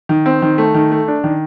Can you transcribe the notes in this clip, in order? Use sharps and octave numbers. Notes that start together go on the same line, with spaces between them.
D#3
C4
D#3
A3
D#3
A3
D4
D#3